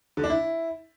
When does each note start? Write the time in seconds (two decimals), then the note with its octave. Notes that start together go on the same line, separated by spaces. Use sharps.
0.17 D3
0.24 D4
0.30 E4